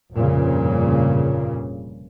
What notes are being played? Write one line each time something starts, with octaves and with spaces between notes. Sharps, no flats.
F1 G2 A#2 C#3